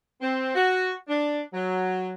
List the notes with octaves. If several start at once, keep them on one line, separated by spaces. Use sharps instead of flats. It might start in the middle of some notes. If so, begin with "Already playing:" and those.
C4
F#4
D4
F#3